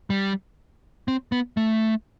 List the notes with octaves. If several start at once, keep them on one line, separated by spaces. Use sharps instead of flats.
G3
C4
B3
A3